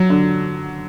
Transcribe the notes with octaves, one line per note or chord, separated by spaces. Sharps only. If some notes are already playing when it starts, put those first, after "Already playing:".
Already playing: F#3
D3